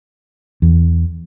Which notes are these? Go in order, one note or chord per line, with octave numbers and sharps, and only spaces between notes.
E2